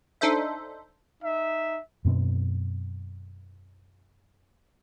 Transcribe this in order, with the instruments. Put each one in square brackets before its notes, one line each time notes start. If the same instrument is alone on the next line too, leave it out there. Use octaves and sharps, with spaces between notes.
[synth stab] D4 D#4 A4 C5 E5
[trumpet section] D#4 E5
[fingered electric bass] F#2 B2 C4